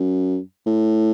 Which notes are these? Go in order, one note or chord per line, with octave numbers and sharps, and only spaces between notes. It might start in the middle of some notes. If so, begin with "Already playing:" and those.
Already playing: F#2
A2